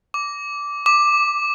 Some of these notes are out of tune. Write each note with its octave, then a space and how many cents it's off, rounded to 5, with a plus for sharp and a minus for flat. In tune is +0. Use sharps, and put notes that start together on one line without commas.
D6 -15
D6 +5